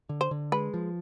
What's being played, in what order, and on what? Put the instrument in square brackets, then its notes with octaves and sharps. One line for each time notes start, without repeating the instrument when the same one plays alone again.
[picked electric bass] D3
[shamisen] C5
[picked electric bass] D3
[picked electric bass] G#3 [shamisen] B4
[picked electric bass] F3